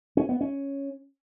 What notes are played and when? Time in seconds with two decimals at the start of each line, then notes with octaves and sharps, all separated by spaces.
0.17 C#4
0.29 B3
0.41 C#4